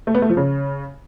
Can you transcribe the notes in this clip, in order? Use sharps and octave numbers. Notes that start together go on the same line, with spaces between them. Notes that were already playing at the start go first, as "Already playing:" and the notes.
A3
B3
A3
F3
C#3